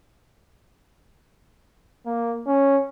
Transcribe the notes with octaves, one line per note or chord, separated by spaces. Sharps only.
A#3
C#4